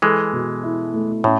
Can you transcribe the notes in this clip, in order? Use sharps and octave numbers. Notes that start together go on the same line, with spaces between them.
E3 G#3 A4
B2
E4
A3
A2 C#4